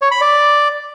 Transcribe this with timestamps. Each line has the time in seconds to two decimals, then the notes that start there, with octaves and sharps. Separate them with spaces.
0.02 C#5
0.11 B5
0.21 D5